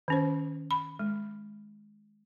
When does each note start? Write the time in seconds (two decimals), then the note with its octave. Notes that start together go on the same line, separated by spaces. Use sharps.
0.08 D#3 C#4 C5
0.71 B5
0.99 G#3